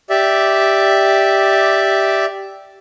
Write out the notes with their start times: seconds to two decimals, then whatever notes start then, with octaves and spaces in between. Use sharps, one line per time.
0.10 G4 D5 E5